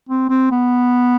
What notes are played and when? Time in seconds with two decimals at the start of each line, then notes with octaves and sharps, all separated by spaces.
0.09 C4
0.30 C4
0.51 B3